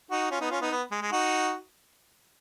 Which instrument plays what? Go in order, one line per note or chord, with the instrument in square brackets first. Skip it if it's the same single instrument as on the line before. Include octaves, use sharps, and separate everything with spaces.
[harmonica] D#4 F#4
C#4 F4
B3 D#4
C#4 F4
B3 D#4
B3
G#3
G#3
D#4 F#4